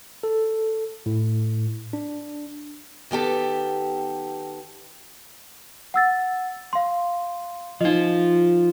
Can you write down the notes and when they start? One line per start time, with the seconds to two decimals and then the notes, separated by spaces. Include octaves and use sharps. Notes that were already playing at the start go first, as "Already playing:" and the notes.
0.23 A4
1.06 A2
1.93 D4
3.11 D#3 B3 G4 A4
5.94 F#5 E6 A6
6.73 F5 C6
7.81 F3 D#4 F4 D#5